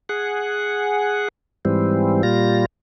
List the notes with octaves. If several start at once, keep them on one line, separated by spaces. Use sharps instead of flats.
G#4 F#5
G#2 E3 G3 C4
A#2 G3 F4 A#6